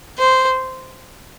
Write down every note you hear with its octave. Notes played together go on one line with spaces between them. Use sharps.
C5